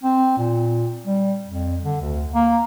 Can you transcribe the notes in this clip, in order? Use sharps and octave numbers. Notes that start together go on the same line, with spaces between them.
C4
A#2
G3
F2
D3
D2
A#3